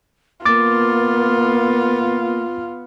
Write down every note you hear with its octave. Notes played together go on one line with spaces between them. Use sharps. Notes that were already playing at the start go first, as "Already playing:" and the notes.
A#3 B3 F4 D6 A6